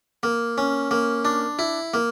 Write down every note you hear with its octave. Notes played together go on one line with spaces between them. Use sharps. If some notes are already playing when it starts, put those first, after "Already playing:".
A#3
C#4
A#3
D4
E4
A#3